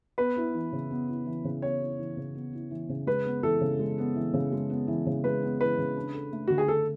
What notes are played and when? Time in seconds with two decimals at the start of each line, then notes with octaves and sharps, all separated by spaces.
0.18 B3 B4
0.36 E4
0.54 E3
0.72 C#3
0.91 B3
1.08 E4
1.26 E3
1.45 C#3
1.62 B3 C#5
1.81 E4
1.99 E3
2.17 C#3
2.35 B3
2.53 E4
2.71 E3
2.89 C#3
3.07 G#3 B4
3.25 B3
3.43 E3 A4
3.61 C#3
3.79 G#3
3.98 B3
4.16 E3
4.34 C#3
4.52 G#3
4.70 B3
4.88 E3
5.06 C#3
5.24 G#3 B4
5.42 B3
5.60 E3 B4
5.78 C#3
5.97 D4
6.14 A4
6.32 A3
6.48 D3 F#4
6.58 G#4
6.68 D4 A4